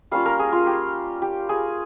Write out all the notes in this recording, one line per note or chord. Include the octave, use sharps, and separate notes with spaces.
G3 A#3 C#4 F4 F5
A#4
G#4
F4
G4
G4
G#4